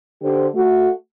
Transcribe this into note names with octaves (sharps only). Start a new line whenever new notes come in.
D3 G4 C5
A3 F#4